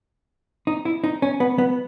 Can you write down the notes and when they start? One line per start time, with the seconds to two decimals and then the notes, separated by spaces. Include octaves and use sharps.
0.67 D#4
0.85 E4
1.04 D#4
1.22 C#4
1.40 B3
1.58 B3